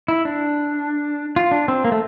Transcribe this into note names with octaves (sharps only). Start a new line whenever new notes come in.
E4
D4
F4
D4
C4
A#3
A3